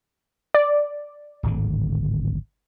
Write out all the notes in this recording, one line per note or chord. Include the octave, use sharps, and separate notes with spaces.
D5
D1 G#1 D3